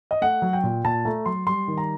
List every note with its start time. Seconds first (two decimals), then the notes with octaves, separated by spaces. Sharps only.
0.11 D#5
0.21 A3 F#5
0.42 F#3
0.53 G5
0.63 A#2
0.84 A#2 A5
1.05 A3 A#5
1.26 F#3 C6
1.47 G3 C6
1.68 D#3
1.78 A#5